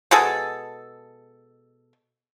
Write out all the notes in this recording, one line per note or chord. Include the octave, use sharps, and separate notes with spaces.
B2 G#3 G#4 A4